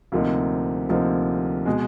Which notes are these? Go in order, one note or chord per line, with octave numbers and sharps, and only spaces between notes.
D2 C3 F3 A#3 D#4
D2 C3 F3 A#3 D#4
B2 G#3